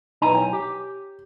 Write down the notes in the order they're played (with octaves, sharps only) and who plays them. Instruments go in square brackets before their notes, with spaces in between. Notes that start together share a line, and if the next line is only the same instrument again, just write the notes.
[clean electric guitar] B1 G#5 A#5 [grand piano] D#4 E4 B4
[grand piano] C#5 G5
[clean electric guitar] G4